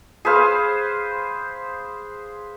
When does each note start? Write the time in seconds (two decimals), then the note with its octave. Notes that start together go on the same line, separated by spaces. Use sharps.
0.25 G#4 B4 C5 F5